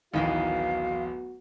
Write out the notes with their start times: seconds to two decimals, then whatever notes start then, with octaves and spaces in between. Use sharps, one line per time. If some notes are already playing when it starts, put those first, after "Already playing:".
0.14 D1 A1 D#3 E3 B3 D#4 F#4 F5